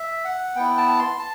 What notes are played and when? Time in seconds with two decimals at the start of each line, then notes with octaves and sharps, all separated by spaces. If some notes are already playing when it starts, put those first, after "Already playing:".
Already playing: E5
0.25 F#5
0.56 B3 E4 G5
0.77 A5
0.99 C6
1.19 A5